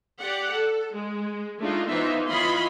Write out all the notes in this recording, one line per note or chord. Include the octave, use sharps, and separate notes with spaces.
G4 D5 F#5
A4
G#3
G#3 A3 D4 D#4 F4
E3 B3 D#4 F4 C5 E5
E3 F4 C#5 D#5 B5 C6